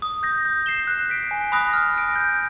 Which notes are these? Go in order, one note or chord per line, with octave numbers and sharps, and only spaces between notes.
D#6
G6 A#6
G6
C7 E7 G7
F#6
B6 D7
G#5
B5 D#6 F#6 A#6
F6
A#6 D7
G6